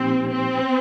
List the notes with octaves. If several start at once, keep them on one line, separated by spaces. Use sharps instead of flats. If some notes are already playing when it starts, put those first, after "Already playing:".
Already playing: A#2 F3 A#3 C4 D#4 G4
C4